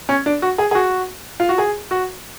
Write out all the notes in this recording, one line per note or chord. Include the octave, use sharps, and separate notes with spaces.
C#4
D4
F#4
G#4
G#4
F#4
F4
F#4
G#4
F#4